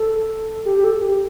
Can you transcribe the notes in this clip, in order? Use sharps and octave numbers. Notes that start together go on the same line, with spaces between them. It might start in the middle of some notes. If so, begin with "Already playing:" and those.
Already playing: A4
G4
G4
A4
G4